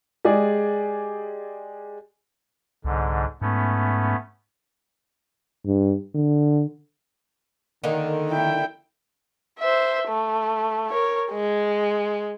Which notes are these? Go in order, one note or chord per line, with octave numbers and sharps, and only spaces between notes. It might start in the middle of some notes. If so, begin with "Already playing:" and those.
G#3 G4 G#4 D5
C2 G#2 D3
G#2 A3 B3 C#4
G2
D3
D3 D#3 A#3 D#4
E4 G5
C5 E5
A3
A#4 C#5
G#3